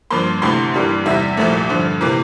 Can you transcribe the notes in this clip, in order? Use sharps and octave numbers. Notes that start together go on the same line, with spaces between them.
G2 F3 A#3 C6
D2 C3 E3 A3 C6
G2 E3 G3 A#3
E2 C3 G3 E5
C2 A#2 F3 A3
G2 D3 F3
C3 E3 A#3